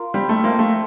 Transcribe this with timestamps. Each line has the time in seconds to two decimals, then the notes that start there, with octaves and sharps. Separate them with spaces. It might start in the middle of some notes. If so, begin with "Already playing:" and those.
Already playing: F4 A#4
0.14 G3 C4
0.29 A3
0.44 A#3 F4 C5
0.59 A3